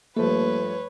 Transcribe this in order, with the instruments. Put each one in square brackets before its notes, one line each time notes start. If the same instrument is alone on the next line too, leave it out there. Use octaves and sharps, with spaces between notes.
[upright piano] G2 F3 A3 [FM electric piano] A#3 [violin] B4 C#5